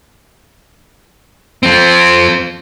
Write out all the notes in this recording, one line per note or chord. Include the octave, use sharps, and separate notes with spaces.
F3 C4